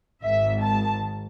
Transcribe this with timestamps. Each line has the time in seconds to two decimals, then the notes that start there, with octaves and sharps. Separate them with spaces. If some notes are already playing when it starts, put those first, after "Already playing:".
0.23 G#1 G#2 D#3 E5
0.62 A5